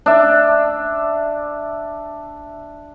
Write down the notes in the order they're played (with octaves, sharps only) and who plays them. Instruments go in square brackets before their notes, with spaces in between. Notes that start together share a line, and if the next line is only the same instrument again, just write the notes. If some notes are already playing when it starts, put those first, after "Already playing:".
[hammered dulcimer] D4 E5